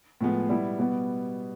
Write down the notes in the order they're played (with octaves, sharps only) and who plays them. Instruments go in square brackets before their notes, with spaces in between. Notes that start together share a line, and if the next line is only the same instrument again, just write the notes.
[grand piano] A2 F3 G#3 B3
B2 G3 B3 E4
B2 G3 B3